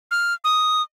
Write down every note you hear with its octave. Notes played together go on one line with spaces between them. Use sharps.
F6
D#6